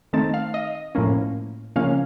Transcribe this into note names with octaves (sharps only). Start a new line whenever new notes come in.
D#3 A3 C4 D#4 A5
F5
D#5
A2 F3 A#3 C#4
C#3 F3 A#3 C#4 F5